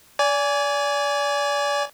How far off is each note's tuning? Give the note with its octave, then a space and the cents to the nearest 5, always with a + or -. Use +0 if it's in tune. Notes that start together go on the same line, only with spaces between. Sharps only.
D5 -30 G#5 +0